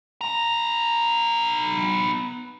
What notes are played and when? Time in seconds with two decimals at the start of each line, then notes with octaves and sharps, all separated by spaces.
0.21 B3 A#5